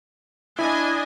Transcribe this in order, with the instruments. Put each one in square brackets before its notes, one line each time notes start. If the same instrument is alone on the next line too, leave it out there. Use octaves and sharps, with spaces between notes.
[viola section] D4 D#5 G#5 [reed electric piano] E4 B5